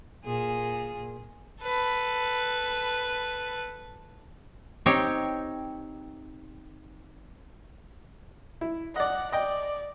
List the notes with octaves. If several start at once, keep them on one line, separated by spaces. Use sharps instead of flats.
A#2 G#4
A4 B4
C4 D#4 G4 C#5
E4
D5 D#5 F#5
D5 D#5 G5